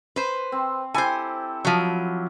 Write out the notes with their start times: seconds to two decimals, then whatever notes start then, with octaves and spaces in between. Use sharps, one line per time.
0.16 B4 C5
0.52 C4
0.94 E4 G4 A4 C5 G#5
1.65 F3 F#3